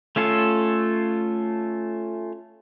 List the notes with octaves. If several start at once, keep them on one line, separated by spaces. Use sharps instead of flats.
A3 C#4 F4 A4